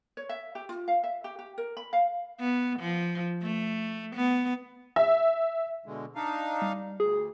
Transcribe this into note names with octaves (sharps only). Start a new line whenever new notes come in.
C#5
E5
G4
F4
F5
E5
G4
G4
A#4
B5
F5
B3
F3
A3
B3
E5
B2 D3 G#3
D4 D#4 F5
G3
D2 G#4